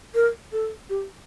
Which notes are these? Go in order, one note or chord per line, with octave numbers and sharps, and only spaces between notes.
A#4
A4
G4